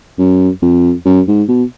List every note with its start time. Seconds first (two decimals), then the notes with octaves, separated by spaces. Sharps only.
0.19 F#2
0.62 F2
1.06 F#2
1.28 G#2
1.48 B2